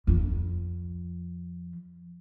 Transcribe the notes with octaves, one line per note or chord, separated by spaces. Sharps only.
F2 F3